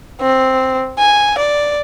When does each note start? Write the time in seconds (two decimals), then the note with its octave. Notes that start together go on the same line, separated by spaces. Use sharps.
0.21 C4
0.99 G#5
1.38 D5